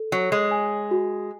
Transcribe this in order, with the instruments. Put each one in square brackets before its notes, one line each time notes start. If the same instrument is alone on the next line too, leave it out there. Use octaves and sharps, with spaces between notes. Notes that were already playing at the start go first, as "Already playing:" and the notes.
Already playing: [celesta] A4
[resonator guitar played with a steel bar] F#3 [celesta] C#5
[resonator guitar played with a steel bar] G#3
[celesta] G#5
F#4